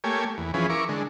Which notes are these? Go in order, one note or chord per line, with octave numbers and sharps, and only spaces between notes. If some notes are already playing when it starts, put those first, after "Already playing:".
A3 A#3 G4 C#5 G#5
E2
E3 F3 C#4 G#4 B4
E4 A#4 C#6 D6
D3 G#3